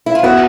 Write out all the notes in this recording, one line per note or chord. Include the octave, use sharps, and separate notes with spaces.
E4
F4
B3 E4 F#4